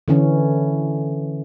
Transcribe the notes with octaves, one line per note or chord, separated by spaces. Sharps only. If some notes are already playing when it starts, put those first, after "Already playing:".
D3 E3 C#4